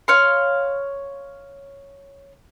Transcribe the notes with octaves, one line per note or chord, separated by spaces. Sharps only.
C#5 F5 C6